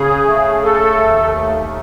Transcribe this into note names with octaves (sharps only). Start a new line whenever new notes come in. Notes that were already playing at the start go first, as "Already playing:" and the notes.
Already playing: C#3 G#4
A3
A3 A4
D#2